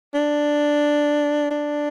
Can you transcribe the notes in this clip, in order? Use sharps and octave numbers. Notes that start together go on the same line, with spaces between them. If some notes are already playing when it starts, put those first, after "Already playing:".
D4
D4